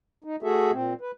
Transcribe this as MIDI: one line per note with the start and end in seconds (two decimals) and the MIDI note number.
0.24 0.36 63
0.43 0.71 57
0.43 0.71 66
0.43 0.71 68
0.43 0.71 69
0.43 0.71 76
0.72 0.94 46
0.72 0.94 60
1.01 1.11 71